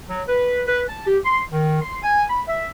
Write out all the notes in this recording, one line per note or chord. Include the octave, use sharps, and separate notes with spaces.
F#3
B4
B4
A5
G4
C6
D#3
C6
G#5
B5
E5